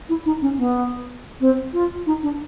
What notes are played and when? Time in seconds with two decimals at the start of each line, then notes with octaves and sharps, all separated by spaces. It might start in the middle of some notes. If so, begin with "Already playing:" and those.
0.09 E4
0.26 D#4
0.42 C#4
0.58 B3
1.41 C4
1.73 F4
2.07 D#4
2.23 D4